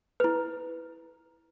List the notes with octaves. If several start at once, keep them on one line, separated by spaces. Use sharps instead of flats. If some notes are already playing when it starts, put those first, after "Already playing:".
E4 B4